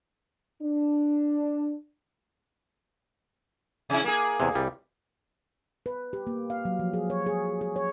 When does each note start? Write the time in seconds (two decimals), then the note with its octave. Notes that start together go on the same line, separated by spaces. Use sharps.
0.63 D4
3.90 C3 E4
4.04 A#3 G#4
4.40 E2 C3
4.55 C2 G3
5.86 B4
6.13 G4
6.27 A#3
6.50 F5
6.65 F#3
6.79 F3
6.94 G#4
7.10 C#5
7.26 G#4
7.61 G#4
7.76 C#5